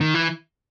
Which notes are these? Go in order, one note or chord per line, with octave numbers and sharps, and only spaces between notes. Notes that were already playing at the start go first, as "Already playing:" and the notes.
D#3
E3